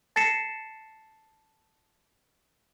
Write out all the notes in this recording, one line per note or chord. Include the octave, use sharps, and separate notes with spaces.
A5 A6 A#6 C7 C#7 E7